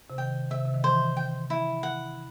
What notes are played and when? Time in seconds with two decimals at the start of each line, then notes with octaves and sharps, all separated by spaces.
0.10 C3
0.18 D#3 G5
0.51 C3 E5
0.65 C3
0.74 D#3
0.84 E3 C5
1.17 G5
1.50 E4
1.83 F#5